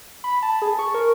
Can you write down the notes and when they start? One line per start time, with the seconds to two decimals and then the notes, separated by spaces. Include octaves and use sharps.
0.24 B5
0.42 A5
0.62 G#4
0.79 C#6
0.94 A#4